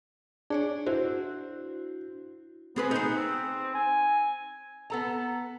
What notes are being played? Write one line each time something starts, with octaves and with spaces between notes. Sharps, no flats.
D4 G#4 C#5 D5
E4 F#4 C5
B3 C4 G#4 B4
D#4 G#4
C4
G#5
B3 A4 A#5